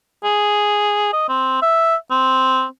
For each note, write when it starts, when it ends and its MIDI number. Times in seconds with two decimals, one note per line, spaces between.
0.24 1.09 68
1.13 1.28 75
1.29 1.60 60
1.62 1.96 76
2.11 2.65 60